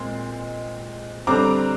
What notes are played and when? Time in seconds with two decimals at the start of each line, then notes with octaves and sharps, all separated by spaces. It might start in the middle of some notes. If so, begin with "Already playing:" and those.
Already playing: A#2 G#3 C4 C6
1.27 D3 G3 C4 A#5 D6